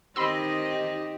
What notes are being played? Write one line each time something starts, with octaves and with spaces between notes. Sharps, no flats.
D#3 C4 D#4 G4 D#5 B5 C6 E6